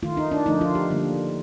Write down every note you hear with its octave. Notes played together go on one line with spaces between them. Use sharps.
D#3 A3 F4
D#4
D4
D3 F3 A3 D#4
F4
G4
D3 G3 A#3